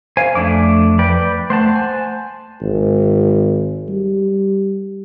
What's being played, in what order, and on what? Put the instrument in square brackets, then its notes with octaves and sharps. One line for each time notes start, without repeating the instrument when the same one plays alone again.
[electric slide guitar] C5 [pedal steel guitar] F5 G#5
[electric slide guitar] F2 [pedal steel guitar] A3 D4 D6
[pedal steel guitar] B4 D5 G5
[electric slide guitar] A3 [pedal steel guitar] C5 F#5 A5
[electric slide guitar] G#5
[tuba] G#1
G3